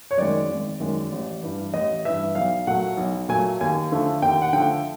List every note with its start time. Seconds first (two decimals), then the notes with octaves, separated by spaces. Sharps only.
0.11 C#5
0.18 F#2 D#3 G#3 D5
0.49 G#1
0.80 F#2 D#3 G#3
1.12 A1
1.43 G2 E3
1.74 A1 D#5
2.05 G2 E3 E5
2.35 B1 F5
2.67 A#2 F#3 A3 F#5
2.97 B1
3.29 A#2 F#3 A3 G#5
3.61 D#2 G#5
3.91 D3 F3 A3
4.22 D#2 G5
4.42 F#5
4.53 D3 F3 A3 G5